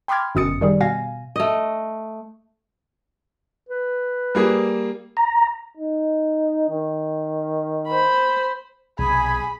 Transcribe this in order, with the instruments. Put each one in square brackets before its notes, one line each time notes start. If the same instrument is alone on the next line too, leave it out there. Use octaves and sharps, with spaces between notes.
[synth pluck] G5 B5 C6 D6 F6 G#6
G1 F#2 B2 D#6 A6 C#7
D#3 G3 G#4
B2 F5 G#5 A#6
[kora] A3 D#5
[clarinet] B4
[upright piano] G3 A#3 G#4
[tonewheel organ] A#5
[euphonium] D#4
D#3
[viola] C5 B5
[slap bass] B1 C3 [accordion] G#4 G#5 [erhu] B5